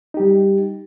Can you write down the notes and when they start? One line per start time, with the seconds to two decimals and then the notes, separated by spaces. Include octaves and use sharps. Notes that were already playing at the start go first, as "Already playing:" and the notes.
0.14 D#4
0.17 G4
0.20 G3